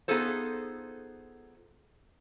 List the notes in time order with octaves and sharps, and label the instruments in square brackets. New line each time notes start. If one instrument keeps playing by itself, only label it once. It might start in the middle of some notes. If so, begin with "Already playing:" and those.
[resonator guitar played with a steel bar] B3 D#4 F4 G#4 A4 C5